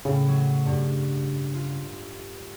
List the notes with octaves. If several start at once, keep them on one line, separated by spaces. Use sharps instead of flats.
A2 C#3
F#3
G2
F4